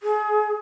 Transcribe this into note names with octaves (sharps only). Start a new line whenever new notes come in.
G#4